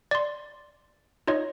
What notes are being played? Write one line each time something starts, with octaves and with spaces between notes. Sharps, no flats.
D5 C6
D#4 F4 C#5 D#5